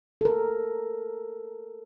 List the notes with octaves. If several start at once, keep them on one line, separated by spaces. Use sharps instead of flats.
A4 A#4